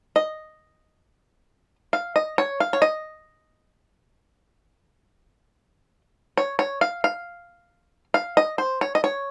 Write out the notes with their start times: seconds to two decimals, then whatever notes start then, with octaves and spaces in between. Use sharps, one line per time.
0.16 D#5
1.93 F5
2.16 D#5
2.38 C#5
2.60 F5
2.73 C#5
2.82 D#5
6.37 C#5
6.59 C#5
6.81 F5
7.04 F5
8.14 F5
8.37 D#5
8.58 C5
8.81 C#5
8.95 D#5
9.04 C#5